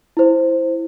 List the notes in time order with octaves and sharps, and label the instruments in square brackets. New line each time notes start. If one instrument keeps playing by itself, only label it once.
[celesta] E4 C5